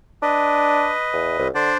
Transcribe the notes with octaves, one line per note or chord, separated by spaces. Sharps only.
D4 B4 D#5
E2
C2
D3 D4 C5 D5